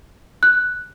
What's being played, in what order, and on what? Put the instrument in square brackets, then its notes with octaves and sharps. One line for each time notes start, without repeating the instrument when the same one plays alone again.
[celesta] F#6